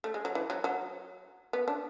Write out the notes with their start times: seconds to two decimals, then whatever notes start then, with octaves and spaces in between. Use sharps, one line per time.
0.04 A3
0.14 G#3
0.25 F#3
0.35 E3
0.50 F#3
0.64 F#3
1.53 B3
1.68 D4